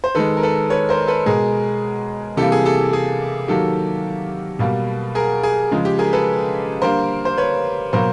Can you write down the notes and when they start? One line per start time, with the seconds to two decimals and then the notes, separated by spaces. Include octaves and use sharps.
0.04 C5
0.15 D#3 G#3 A4 B4
0.37 A#4
0.43 A4 B4
0.70 B4 C#5
0.89 A#4 C5
1.07 A4 B4
1.26 B2 G#3 G#4 A#4
2.37 C3 E3 G3 A#3 G4 A4
2.52 G#4
2.65 G4 A4
2.79 G4
2.93 G#4
3.48 D#3 F#3 A#3 G4 A4
4.59 B2 G3 A#3
5.15 G#4 A#4
5.43 G#4
5.71 C#3 F3 G#3
5.85 G4
5.98 G#4 A#4
6.13 A4 B4
6.82 D3 G3 A#3 A#4 C5
7.25 C5
7.38 B4 C#5
7.93 B2 F#3 A#3 A#4 C5